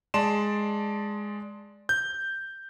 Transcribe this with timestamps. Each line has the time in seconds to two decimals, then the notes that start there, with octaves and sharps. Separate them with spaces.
0.14 G#3 D5 A5 C6 E7
1.89 G6